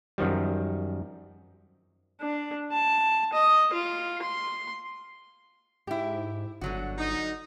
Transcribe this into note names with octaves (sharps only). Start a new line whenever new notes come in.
F#2 D#3 F3 G3
D4
A5
D#5
F4
C6
G#2 E4 G4
G1 D3 F#3 F#4
D#4